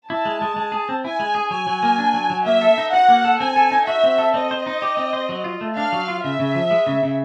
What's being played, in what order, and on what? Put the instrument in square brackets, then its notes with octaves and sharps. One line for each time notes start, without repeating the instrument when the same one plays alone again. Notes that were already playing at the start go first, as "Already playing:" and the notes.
[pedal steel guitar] E4 [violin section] A5
[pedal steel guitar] G#3
G#3
G#3
G#4
C4
[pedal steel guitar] E4 [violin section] G#5
[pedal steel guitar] G#3
G#4
[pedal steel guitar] F#3 [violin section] G#5
[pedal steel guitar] F#3
A#3
D4
F#3
F#3
[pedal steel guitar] A#3 [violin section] E5
[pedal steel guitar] A4
D#4
[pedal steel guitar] F#4 [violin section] F#5
[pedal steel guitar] A#3
A4
[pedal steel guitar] C4 [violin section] G#5
[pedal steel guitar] A4
D#4
[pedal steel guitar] F#4 [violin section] E5
[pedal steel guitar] C4
A4
[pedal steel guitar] C4 [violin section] D#5
[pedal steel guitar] C5
D#4
G4
C4
C5
F#3
F4
A3
[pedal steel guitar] D4 [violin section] F5
[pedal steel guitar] F#3
F4
[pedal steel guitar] C#3 [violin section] E5
[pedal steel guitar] C#3
F3
G#3
C#3
C#3